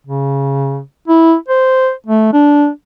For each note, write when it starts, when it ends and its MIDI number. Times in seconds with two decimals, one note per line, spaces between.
0.07 0.81 49
1.08 1.35 64
1.48 1.91 72
2.06 2.31 57
2.33 2.68 62